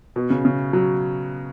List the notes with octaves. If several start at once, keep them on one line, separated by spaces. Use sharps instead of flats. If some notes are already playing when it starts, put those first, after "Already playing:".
B2
C#3
C#3
F#3